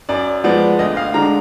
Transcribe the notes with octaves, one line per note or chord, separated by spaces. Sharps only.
F#2 D5
F3 G#3 B3 D5
D2 D#5
F5
D3 G#3 D4 A#5